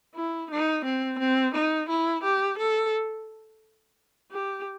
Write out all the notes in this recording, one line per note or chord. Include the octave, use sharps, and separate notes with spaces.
E4
D#4
C4
C4
D#4
E4
G4
A4
G4